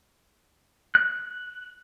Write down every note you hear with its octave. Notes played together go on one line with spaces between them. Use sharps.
F#6